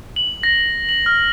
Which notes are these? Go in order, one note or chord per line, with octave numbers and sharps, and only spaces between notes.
F#7
A#6
F#7
F6